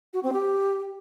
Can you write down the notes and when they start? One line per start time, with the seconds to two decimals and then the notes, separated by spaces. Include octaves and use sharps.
0.14 F#4
0.23 C4
0.33 G4